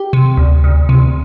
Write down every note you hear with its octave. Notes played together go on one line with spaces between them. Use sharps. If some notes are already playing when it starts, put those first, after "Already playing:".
Already playing: G4
C3
D2
D2
C3